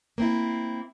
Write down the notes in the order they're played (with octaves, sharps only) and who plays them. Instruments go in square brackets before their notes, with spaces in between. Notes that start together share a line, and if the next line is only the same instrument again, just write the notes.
[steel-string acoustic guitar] A#3 C4 E4